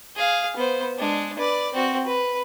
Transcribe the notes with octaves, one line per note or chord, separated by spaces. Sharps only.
G#4 F5
B3 C5
G#3 D4
B4 D5
C4 F#4
B4